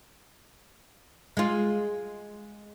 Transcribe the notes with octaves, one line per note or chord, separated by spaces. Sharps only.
G#3 F4